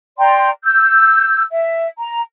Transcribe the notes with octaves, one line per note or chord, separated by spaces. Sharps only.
D5 G5 A#5 C6
E6 G6
E5
A#5